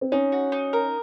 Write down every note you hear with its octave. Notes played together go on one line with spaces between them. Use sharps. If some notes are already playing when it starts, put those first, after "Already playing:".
C4
C#4 D#4
F#4
D#4
A#4